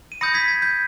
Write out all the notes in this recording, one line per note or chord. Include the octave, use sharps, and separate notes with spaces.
D#7
B5 D#6 G6 A#6 C#7
G#6 B6
G#6
G6